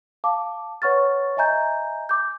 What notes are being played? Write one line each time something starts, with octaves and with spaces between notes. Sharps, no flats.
F5 A5 D6
B4 C#5 F#5 C#6 F6 A6
D#5 E5 G#5 A#5 G6
D6 G6